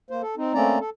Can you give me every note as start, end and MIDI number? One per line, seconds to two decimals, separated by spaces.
0.10 0.22 58
0.10 0.22 72
0.22 0.35 69
0.37 0.54 60
0.37 0.54 63
0.54 0.79 57
0.54 0.79 58
0.54 0.79 60
0.54 0.79 61
0.54 0.79 74
0.54 0.79 82
0.80 0.90 69